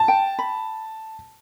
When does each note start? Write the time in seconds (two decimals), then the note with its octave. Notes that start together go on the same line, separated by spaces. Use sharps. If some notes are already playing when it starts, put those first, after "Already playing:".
Already playing: A5
0.08 G5
0.39 B5